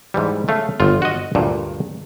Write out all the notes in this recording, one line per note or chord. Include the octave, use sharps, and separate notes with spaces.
G#2 E3 G3
C#3 A3 F5
G1 F4
F#4 D#5
D2 G2 A#2